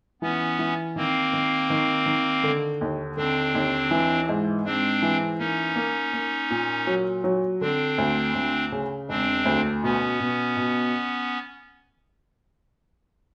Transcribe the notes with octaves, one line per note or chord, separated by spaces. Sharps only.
E3 B3 C#4
E3
D#3 A#3 C4
D#3
D#3
D#3
D3
D#2
D3 C4 D4
D#2
E3
G#2
G#2 C4 D4
E3
A#3 C#4 D#4
A#3
A#3
A#2
F#3
F#3
D3 C4 D4
D2
D2
C#3
E1 C4 D4
D2
B2 B3 C#4
B2
B2